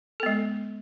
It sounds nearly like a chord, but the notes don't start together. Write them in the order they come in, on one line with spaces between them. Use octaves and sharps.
A4 B3 G#3